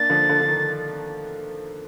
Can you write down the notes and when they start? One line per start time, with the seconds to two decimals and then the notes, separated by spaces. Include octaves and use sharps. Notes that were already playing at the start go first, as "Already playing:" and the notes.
Already playing: A#3 D4 A6
0.10 D3 F3
0.29 D3
0.41 D3
0.48 D#3